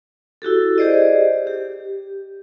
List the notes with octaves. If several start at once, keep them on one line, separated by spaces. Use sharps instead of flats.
E4 F#4 G4 A4
G4 G#4 C5 D5 D#5
G4